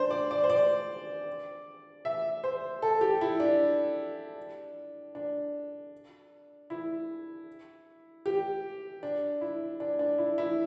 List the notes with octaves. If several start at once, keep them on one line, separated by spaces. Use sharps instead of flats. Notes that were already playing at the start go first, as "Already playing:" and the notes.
Already playing: D4 C5
D5
D5
C5
D5
E5
C5
A4
G4
E4
D4
D4
E4
G4
D4
E4
D4
D4
E4
E4